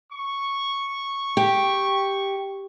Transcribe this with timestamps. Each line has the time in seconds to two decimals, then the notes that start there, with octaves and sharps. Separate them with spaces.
0.13 C#6
1.37 G4